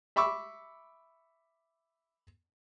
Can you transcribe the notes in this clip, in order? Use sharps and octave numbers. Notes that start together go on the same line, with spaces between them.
E5 B5 C#6 D6 E6